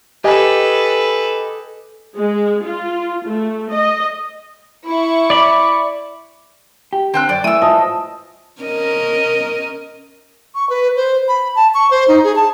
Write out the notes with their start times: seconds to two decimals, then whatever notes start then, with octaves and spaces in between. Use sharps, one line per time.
0.24 G4 A4 B4 D#5 G#5
2.16 G#3
2.65 F4
3.27 A3
3.72 D#5
4.87 E4 C#6
5.30 D5 B5
6.93 G4
7.14 D3 C4 G5 F#6
7.29 F#2 D5
7.44 E3 A3 D#6 E6
7.62 G#2 F3 D#5 E5
8.62 C#4 A#4 D#5
10.55 C#6
10.70 B4
10.96 C5
11.28 B5
11.55 A5
11.74 C#6
11.91 C5
12.08 D#4
12.24 G#4
12.36 A5